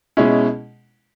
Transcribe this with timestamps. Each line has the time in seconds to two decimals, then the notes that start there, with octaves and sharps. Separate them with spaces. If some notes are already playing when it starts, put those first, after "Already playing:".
0.17 B2 G#3 C#4 E4